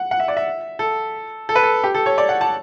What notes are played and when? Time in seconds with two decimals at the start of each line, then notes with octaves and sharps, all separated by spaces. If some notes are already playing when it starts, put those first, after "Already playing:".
Already playing: F#5
0.11 F#5
0.20 E5
0.28 D5
0.37 E5
0.79 A4
1.49 A4
1.55 B4
1.63 A4
1.84 G4
1.94 A4
2.06 C#5
2.18 D5
2.29 F#5
2.41 A5